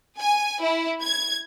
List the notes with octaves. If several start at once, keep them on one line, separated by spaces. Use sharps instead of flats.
G#5
E4
G#6